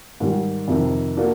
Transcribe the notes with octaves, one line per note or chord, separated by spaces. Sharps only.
G#2 D#3 G3
F2 C3 D#3
A#3 D4 F#4